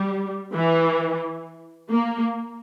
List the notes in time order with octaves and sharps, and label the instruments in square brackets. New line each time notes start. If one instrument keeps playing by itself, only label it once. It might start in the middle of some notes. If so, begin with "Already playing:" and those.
Already playing: [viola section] G3
E3
A#3